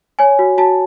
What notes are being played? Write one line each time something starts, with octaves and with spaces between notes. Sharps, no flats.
C#5 G#5
F#4
F#4 A5